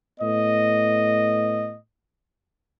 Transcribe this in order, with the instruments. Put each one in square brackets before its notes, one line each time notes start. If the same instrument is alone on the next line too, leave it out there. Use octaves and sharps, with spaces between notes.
[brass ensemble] A2 B3 D#5